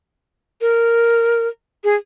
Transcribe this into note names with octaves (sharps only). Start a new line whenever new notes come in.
A#4
G#4